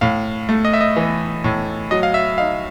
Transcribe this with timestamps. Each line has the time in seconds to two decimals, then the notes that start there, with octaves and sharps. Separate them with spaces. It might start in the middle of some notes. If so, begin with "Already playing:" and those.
0.01 A2 F5
0.49 A3
0.65 D#5
0.73 E5
0.81 D#5
0.96 E3
1.44 A2
1.91 F#3 D#5
2.03 F5
2.14 E5
2.38 D#4 F5